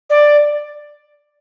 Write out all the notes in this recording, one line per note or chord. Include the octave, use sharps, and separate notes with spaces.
D5